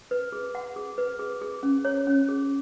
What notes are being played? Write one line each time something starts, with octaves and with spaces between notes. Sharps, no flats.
B4
G#4
F#5
G#4
B4
G#4
G#4
C#4
C#5
C#4
G#4